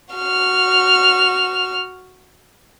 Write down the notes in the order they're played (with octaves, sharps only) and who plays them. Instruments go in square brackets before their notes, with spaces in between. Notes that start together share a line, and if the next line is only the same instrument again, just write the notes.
[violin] F#4 F6